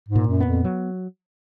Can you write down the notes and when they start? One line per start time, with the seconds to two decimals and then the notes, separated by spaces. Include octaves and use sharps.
0.09 G#2
0.15 A#2
0.28 F#2
0.40 F2 B3
0.64 F#3